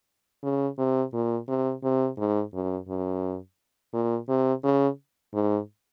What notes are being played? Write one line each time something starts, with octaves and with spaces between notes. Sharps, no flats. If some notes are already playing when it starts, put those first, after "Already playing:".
C#3
C3
A#2
C3
C3
G#2
F#2
F#2
A#2
C3
C#3
G#2